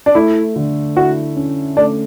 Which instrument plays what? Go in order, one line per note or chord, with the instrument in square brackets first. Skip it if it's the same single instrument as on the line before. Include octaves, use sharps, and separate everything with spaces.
[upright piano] D4
[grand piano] A3 [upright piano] E4
[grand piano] D3
[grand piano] E4 [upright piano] F#4
[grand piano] C#4
[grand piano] A3 [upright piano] D4